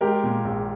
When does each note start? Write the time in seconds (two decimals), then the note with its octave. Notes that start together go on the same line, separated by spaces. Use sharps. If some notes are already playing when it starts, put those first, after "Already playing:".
0.01 G#3 G4 A#4
0.23 A#2
0.45 A#1